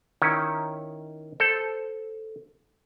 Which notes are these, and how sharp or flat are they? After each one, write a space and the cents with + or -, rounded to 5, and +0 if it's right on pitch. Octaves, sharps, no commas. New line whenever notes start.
D#3 +0 C#4 +5 E4 +0
A4 +0 C5 +0